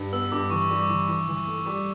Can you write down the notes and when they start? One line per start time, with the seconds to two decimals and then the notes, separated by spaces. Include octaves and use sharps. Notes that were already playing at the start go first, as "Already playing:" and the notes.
Already playing: G2
0.13 B3 E6
0.32 G2 D6
0.50 E3 C#6
0.70 G3 C#6
0.79 D6
0.90 E3
1.08 E3 D6
1.28 E3
1.37 C#6
1.47 A3
1.66 G3 D6